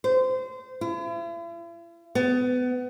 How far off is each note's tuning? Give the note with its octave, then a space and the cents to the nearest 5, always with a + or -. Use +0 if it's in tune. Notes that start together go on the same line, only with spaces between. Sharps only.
C5 -25
E4 +45
B3 +25